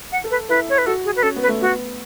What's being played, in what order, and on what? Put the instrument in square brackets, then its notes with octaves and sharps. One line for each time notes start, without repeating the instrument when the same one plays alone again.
[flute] F#5
[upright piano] A4
[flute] B4
[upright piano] E4 [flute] B4
[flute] C#5
B4
[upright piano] F#4 [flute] A4
[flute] G#4
B4
[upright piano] C#4 [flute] A4
[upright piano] B3
[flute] B4
[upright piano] A3
[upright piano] B3 [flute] F#4